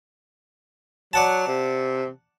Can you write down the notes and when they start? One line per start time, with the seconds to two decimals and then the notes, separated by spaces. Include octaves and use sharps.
1.13 F#3 D5 F#5 A5
1.47 C3